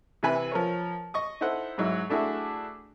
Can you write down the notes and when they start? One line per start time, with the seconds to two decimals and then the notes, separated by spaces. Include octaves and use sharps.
0.23 C3 E3 E4 B4 G#5 B5
0.52 F3 A#4 C#5
1.14 D#5 C#6 D#6
1.41 D#4 E4 A4 C5 F#5
1.78 G#2 F#3 D#4 E4
2.10 A3 D4 E4 F#4 G#4